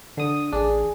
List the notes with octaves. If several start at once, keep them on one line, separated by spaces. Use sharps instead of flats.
D3 D#6
A1 D4 G#4